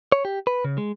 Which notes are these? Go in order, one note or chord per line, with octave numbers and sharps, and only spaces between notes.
C#5
G4
B4
C#3
G#3